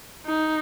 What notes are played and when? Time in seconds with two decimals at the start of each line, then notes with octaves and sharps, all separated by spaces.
0.26 D#4